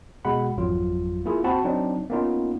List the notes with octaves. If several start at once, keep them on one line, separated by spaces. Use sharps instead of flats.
B2 G#3 F#5 B5
G#1 F2 F#3 F4
A#3 E4 F4 G#4
C4 F#4 F#5 A5 B5
F#3 C4 D4 D#4
A#3 B3 C#4 D#4 F4